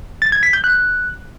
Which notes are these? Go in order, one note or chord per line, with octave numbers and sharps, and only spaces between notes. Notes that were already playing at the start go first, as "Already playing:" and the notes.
A6
G#6
B6
G6
F#6